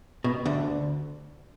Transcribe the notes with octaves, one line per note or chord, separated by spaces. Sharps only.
B2
D2 D3